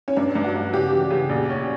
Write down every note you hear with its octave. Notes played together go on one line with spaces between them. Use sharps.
C#4
G2 D4
G2
F#4
G2
C#3 G4
E3
C#3
A#1
C#4